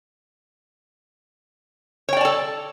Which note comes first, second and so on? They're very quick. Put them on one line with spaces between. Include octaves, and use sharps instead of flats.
C#5 G5 D5 A5 A4